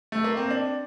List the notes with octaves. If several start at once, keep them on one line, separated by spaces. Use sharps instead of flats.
A3
A#3
C4
D4